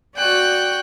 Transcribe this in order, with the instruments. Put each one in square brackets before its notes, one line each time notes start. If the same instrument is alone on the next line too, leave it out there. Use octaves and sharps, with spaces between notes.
[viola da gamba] F#4 D5 [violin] G5 F#6